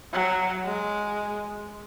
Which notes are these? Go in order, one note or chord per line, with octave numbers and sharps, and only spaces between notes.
F#3
G#3